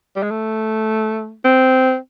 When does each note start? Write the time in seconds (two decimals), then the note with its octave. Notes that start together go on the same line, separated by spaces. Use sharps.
0.16 G3
0.23 G#3
0.30 A3
1.45 C4